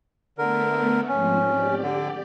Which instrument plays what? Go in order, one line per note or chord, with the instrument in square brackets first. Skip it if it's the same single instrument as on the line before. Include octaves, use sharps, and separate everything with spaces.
[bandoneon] D3 A#4 [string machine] A3 B3
[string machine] G#2 F3 C4 [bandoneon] C#4
[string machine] G4 D5
[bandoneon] D3